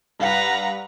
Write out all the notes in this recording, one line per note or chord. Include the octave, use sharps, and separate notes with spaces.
G2 B4 F5 F#5 A#5